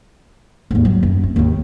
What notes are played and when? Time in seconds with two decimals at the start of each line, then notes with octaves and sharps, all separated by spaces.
0.71 D#2 G#2
0.85 F#3
1.03 F#2
1.24 C4
1.36 D#2 G#2